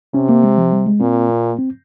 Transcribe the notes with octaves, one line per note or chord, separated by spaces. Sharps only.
C3 C#4
A#3
G#3
F3
G3
G#3
A#2 C4
A#3
C4